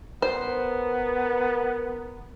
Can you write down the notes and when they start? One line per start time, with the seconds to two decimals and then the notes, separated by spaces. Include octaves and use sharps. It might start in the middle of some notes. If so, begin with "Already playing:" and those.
0.22 B3 A#4 C5